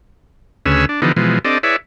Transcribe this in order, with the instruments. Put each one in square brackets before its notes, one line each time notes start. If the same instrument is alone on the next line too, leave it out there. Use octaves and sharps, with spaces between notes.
[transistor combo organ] D2 C#3 C#4 G#4 B4 E6
D4
D3 E3 F3 B3 D#4 G4
B2 E3 F3 G#3
C4 D4 G4 A4 D5 D#5
E4 G#4 B4 C#5 D5 E5